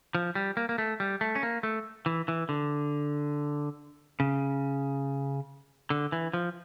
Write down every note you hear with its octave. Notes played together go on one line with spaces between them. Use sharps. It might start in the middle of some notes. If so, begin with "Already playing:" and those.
F3
G3
A#3
A#3
A3
G3
A3
C#4
A#3
A3
E3
E3
D3
C#3
D3
E3
F3